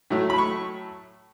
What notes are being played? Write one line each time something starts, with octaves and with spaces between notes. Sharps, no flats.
A2 F#3 A3
B5
C#6